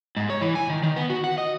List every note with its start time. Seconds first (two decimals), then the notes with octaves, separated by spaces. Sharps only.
0.17 G#2
0.30 C#5
0.41 E3
0.55 G#5
0.69 D#3
0.83 D#3
0.96 B3
1.10 F#4
1.24 F#5
1.38 D#5